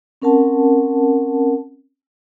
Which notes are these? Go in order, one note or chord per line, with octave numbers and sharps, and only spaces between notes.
C4 C#4 A#4 F#5 A5